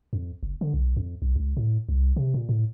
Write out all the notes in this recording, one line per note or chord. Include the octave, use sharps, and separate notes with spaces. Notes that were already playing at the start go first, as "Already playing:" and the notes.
F2
F#1
D3
B1
F2
B1
C#2
A2
C2
C3
A#2
A2